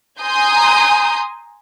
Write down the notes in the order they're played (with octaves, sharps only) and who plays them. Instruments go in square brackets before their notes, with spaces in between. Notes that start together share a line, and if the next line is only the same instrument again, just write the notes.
[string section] G#5 A#5 C6 D#6 G6